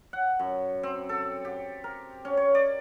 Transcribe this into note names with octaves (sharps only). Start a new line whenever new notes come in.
F#5
F#2
C4
A4
G4
A#4
C#4
C#5
D5